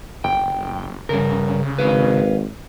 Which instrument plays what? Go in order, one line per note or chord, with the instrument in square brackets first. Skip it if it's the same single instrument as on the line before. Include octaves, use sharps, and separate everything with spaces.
[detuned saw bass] F#1 [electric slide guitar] G5
[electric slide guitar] G2 A#4 [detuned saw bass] C#3
[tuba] G#1 [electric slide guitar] B4 F5